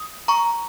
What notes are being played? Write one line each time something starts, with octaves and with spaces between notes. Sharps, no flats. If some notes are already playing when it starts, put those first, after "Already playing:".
Already playing: D#6
A#5 C#6